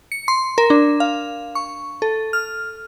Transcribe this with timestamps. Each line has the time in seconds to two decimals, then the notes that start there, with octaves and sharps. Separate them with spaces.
0.12 C#7
0.28 C6
0.58 A#4
0.70 D4
1.00 F5
1.55 C#6
2.02 A4
2.33 F6